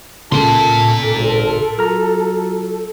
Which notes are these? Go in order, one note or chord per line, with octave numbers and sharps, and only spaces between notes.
C#2 A#2 C#3 F4 A4 A#4 A5 C6
G#1
F#3 F4 A#5 F6